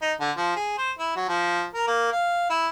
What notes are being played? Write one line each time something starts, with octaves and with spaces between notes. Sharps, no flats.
D#4
D3
F3
G#4
C5
E4
F#3
F3
A#4
A#3
F5
E4